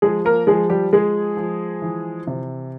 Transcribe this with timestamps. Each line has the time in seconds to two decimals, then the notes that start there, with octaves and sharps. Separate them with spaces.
0.02 F3 G#3 G#4
0.25 A#3 A#4
0.47 F3 G#3 G#4
0.70 G3 G4
0.92 F3 G#3 G#4
1.37 F3
1.82 E3
2.27 C3